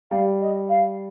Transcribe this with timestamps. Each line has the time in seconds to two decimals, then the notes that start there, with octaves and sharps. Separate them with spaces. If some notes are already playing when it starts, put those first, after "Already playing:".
0.11 G3 F5
0.41 D#5
0.69 F5